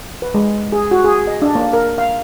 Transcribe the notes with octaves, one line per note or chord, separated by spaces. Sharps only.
B4
G#3
G#4
F#4
G#4
D#5
D4
A#3
A#4
F5